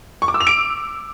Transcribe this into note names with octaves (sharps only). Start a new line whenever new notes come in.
C#6
D6
E6
F7
D7